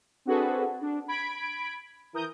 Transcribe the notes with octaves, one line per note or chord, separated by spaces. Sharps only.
C4 D4 F#4 G#4 A4 B4
D4
B5 G#6 B6 D7
E3 A#4 D#6 G6